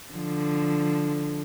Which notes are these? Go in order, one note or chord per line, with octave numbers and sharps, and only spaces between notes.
D3 F3